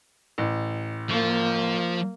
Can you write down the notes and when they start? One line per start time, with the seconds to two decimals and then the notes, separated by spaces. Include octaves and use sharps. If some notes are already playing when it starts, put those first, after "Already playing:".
0.38 A1
1.09 F3 A#3